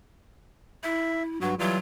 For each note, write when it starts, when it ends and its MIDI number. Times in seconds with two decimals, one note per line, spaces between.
0.84 1.38 64
0.84 1.23 76
1.41 1.55 43
1.41 1.55 54
1.41 1.55 66
1.59 1.78 52
1.59 1.78 54
1.59 1.78 55
1.59 1.78 65